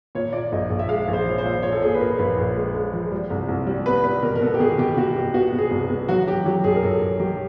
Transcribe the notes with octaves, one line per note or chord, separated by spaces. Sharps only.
A#2 C#5
A#2 D5
A#1 D#5
A#1
E5
G#3 F5
A#1
C5
F3 C#5
C5
A#2
A#2 C#5
A4
A#2 G#4
B4
A#2 A#4
A#1 B4
A#1
G#3
G#3
F3
G3
C2
C2
G3
B3 B4
G3 B4
B2 A#4
A#4
B3 A4
G4
B2 G#4
B2 G4
B2 F#4
B2 G4
B3 F#4
B3
G#4
C2
B3
F#3 F#4
F#3 G4
F#3 G4
B1 G#4
A#4
B1 A4
B1
F#3 G4